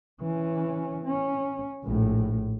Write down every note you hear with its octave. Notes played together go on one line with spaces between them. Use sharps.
E3 C#4
C#4
A#1 A2